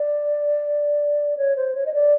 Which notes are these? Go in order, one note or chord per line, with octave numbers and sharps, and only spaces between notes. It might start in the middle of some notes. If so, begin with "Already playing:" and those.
Already playing: D5
C#5
C5
C#5
D#5
D5